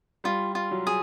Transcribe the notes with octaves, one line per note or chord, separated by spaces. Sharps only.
G3 F4
F4
F#3
G#4